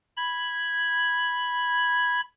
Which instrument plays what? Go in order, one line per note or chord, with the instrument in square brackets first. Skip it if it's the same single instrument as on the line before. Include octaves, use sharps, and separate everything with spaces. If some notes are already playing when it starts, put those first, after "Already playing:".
[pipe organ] B5 G#6